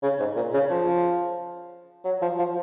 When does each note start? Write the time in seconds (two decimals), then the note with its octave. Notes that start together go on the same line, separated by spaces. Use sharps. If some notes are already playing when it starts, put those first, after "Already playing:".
0.03 C#3
0.19 G#2
0.36 A#2
0.53 C#3
0.70 F3
2.04 F#3
2.22 F3
2.38 F3